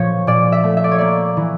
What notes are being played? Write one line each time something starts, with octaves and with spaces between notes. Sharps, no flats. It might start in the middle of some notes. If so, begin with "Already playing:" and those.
Already playing: A#2 F3 C#5
A#2 D5
E5
A3
E5
D5
C#5
A#3 D5
E3